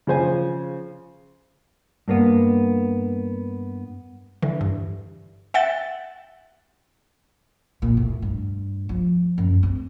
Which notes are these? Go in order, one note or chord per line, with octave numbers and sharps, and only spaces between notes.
C#3 F3 C5 G#5
G2 A#3 B3
D3 E3
G2
E5 F#5 G5 A6
A#2
A2
G2
F3
F#2
C4